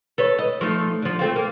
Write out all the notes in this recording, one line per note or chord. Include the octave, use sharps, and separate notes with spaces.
A4 B4 C#5
D#5
F3 A3 D#4
D3 F3
A3 C4 F4
A#3